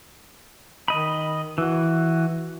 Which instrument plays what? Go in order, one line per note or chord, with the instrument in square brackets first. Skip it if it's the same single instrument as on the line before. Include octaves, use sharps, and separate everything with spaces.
[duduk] D#3 [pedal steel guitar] D#5 B5
[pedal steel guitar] E3 [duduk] F#4